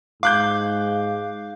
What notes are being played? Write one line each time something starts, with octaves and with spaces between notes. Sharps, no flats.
G#2 F5 D6 F#6 G6